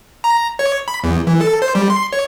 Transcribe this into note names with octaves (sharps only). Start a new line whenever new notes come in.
A#5
C#5
B5
E2
E3
A4
C5
G3
C6
C#5